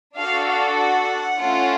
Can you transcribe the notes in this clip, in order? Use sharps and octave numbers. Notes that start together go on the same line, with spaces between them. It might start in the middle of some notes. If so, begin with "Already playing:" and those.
D4 F#4 A4 F5
F5
F#5
A3 C#4 F4 A4